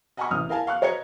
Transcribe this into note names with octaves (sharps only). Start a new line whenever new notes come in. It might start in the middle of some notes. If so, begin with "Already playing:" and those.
D#5 F#5 G#5 A#5 B5 C#6
A1 C3 D#6 F6
E4 A#4 F5 G#5 A5
F5 C#6 F#6
B4 C#5 D#5 A#5 G#6 C#7